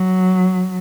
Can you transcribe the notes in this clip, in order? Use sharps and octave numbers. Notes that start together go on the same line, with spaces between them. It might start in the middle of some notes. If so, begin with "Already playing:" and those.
Already playing: F#3